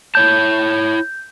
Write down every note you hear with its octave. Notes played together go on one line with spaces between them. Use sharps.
E4 C#5 A5 G6